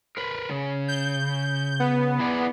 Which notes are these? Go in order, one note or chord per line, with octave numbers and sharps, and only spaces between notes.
A#4 B4
C#3
G6
B3
E4 G#4 D5